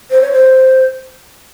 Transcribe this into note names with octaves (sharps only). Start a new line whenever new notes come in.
C5
C#5
C5